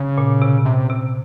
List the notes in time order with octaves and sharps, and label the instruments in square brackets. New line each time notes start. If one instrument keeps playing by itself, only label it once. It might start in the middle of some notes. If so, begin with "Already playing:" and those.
Already playing: [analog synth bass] C#3
[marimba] A#2
C3
[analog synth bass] C3
[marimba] C3